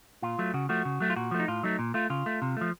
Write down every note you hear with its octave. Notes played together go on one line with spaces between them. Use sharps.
A#2 F4
F#3 A3
C#3 F#4
F3 A3 F#4
C#3
F#3 A3
F4
A#2 F#4
F3 A3
D#4
A2 F4
F#3 A3 D#4
A#2
A3 F4
C#3 F4
A3
C3
F3 A3